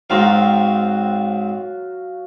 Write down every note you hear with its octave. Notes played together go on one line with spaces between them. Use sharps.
G#2 F#3 C4 F4 F#4 F5